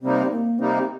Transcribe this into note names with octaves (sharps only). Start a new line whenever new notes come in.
C3 G3 A#3 C4 D#4
A#3
C3 G3 A#3 C4 D#4